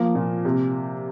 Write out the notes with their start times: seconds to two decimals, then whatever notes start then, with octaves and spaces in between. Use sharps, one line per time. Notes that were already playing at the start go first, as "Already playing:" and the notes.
Already playing: F3 A#3
0.15 A#2
0.45 C3